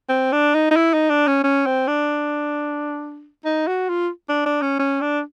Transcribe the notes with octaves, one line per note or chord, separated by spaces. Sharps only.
C4
D4
D#4
D#4
E4
D#4
D4
C#4
C#4
C4
D4
D#4
F#4
F4
D4
D4
C#4
C#4
D4